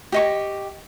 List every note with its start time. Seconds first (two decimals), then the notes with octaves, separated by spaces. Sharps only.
0.12 G4 D#5 C#6